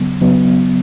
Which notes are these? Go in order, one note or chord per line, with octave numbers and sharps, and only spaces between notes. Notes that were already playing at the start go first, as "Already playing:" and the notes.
Already playing: C#3 F#3 B3
C#3 F#3 B3